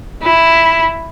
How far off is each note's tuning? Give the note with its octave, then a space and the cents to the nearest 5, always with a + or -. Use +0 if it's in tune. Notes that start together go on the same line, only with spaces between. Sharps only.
E4 +0